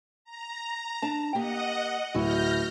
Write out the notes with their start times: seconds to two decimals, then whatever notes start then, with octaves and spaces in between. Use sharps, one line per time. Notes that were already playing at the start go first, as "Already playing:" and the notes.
0.24 A#5
1.02 D4 A5
1.35 A#3 G4 D#5 F#5
2.15 D1 E4 F#4 E5 F6 G6 A#6